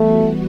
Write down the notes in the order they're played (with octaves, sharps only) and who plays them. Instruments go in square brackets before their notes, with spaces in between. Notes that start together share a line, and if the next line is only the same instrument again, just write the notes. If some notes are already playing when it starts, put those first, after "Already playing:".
Already playing: [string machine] E3 G3 B3 F#4 [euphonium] A3